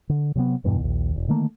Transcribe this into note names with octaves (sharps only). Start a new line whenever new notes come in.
D3
C3 F#3 G3 B3
E2 G2 B2 E3
A#1 D#2
E1
D3 D#3 A3 A#3